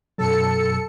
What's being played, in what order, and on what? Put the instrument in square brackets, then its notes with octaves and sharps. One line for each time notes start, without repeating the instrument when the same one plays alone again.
[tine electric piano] F#2 B2 F#3 [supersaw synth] A4 C#7